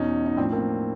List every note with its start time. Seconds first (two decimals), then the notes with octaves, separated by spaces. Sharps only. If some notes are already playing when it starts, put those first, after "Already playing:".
Already playing: E2 B2 C#4 D#4
0.26 D#4
0.37 A2 F3 C4 D4
0.52 A#3 C4